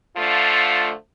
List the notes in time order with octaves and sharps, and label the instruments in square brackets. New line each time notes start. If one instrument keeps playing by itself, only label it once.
[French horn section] D3 F3 A3 F4